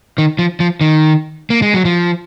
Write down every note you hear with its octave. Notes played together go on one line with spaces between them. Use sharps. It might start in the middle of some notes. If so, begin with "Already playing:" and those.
D#3
F3
F3
D#3
A#3
G#3
F#3
F3